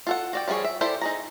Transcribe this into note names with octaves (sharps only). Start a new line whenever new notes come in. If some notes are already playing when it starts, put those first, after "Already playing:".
F4 A4 F#5
F#4 D5 G5
F3 G3 E4 G#4 C#5
E5
E4 G4 A4 C5 D5
D#4 G#4 A#5